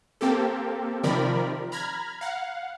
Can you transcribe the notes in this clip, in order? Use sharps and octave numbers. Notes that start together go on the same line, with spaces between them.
A#3 C4 G4 A4
C3 D#3 F3 A#4 D5 B5
A#5 B5 F6 G#6
F5 F#5